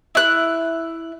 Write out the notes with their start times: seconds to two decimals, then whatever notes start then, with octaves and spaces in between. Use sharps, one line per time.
0.15 E4 F#6